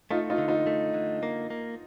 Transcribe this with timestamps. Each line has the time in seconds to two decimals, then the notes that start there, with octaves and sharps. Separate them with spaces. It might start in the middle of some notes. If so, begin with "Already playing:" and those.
0.11 A3 D#4 F4
0.30 D#4 F4
0.38 D3
0.48 D#4 F4
0.67 A3
0.94 D3
1.23 A#3
1.50 A#3